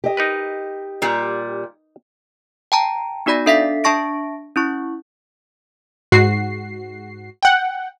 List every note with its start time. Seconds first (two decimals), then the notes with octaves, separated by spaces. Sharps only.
0.04 G4 D#5
0.17 D#4 A#4 B4
1.02 A#2 G3
2.72 G5 A5 A#5
3.26 B3 D#4 F#4 D5 B5 A#6
3.46 D4 A4 E5 F5 B6 C7
3.84 D4 E5 A5 C#6 A#6 D7
4.56 C#4 E4 C#6
6.12 G#2 F#4 C7
7.43 F#5 G5